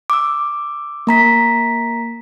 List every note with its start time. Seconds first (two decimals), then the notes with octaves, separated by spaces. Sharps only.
0.10 D6 E6
1.07 A#3 A#5 B6